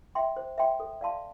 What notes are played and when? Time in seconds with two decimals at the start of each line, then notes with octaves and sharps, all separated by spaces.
0.15 E5 G5 C6
0.37 C5
0.58 E5 G5 C6
0.80 A4
1.01 D5 F5 A5 C6